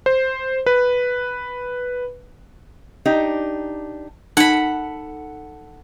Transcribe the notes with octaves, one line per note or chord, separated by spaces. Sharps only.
C5
B4
D4 D#4 G4
D#4 A4 F#5 B5